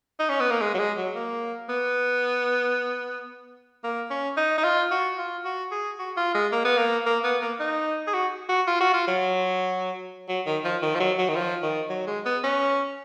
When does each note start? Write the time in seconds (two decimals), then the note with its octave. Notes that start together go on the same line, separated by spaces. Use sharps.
0.20 D#4
0.29 C#4
0.40 B3
0.51 A#3
0.61 G#3
0.74 F#3
0.79 G#3
0.97 F#3
1.15 A#3
1.69 B3
3.84 A#3
4.10 C#4
4.37 D#4
4.58 D#4
4.64 F4
4.91 F#4
5.18 F4
5.45 F#4
5.71 G#4
5.99 F#4
6.17 F4
6.34 G#3
6.52 A#3
6.65 B3
6.78 A#3
7.06 A#3
7.24 B3
7.41 A#3
7.60 D#4
8.07 G#4
8.14 F#4
8.49 F#4
8.67 F4
8.80 F#4
8.94 F4
9.07 F#3
10.28 F#3
10.46 D#3
10.64 F3
10.82 D#3
10.95 F3
11.00 F#3
11.18 F#3
11.29 D#3
11.36 F3
11.62 D#3
11.90 F#3
12.07 G#3
12.26 B3
12.44 C#4